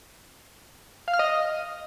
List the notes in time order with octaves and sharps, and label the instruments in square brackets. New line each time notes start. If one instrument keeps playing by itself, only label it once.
[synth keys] F5
F6
D#5